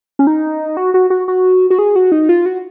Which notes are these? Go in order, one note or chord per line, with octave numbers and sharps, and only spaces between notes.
C#4
D#4
F#4
F#4
F#4
F#4
F#4
G#4
F#4
D#4
F4
F#4